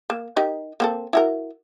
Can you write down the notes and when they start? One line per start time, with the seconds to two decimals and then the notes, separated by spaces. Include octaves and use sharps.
0.10 A#3
0.36 D#4 G4 A#4
0.80 A#3 C4 A4
1.13 E4 F#4 A#4